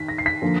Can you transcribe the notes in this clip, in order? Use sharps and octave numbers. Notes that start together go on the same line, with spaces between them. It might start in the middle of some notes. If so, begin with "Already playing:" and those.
Already playing: D#3 B6
A#6
C7
B6
D3 F3 A#3